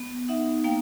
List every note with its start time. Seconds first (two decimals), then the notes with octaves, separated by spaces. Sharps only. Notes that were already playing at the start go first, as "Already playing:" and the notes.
Already playing: B3
0.29 D#4 E5 F#5
0.64 A#3 F5 G5